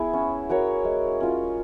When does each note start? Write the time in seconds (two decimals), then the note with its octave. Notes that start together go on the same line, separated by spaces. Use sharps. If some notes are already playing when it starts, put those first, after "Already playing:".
Already playing: B3 E4 G#4
0.13 C#4
0.49 F#4 A#4 C#5
0.85 G#3
1.20 C#4 F4